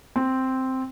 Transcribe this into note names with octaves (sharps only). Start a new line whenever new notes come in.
C4